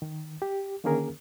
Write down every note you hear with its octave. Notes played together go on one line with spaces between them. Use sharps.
D#3
G4
D3 D#3 A#3 C#4 G#4 A#4